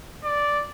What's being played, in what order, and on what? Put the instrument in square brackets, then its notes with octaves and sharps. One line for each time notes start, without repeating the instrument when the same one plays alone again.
[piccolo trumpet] D5